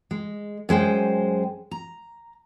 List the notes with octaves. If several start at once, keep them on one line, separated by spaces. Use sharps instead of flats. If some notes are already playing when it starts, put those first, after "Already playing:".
G#3
F#2 G#3 C5 G5
A#5